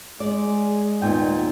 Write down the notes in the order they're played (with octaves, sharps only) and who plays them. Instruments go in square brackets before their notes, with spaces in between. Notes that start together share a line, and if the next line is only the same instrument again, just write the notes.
[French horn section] G#3 [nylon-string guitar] D5
[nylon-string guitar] D#2 A#2 G5 [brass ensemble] B3 D#4